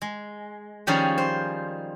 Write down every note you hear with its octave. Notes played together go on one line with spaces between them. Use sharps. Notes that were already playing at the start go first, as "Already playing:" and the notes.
G#3
D#3 F3 G3 C#4 D#4 G#4
C5